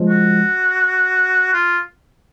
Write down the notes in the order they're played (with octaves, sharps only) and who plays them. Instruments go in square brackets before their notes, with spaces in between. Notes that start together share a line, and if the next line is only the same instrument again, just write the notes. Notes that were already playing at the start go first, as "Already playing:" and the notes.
Already playing: [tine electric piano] F3 G#3
[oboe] F#4
F4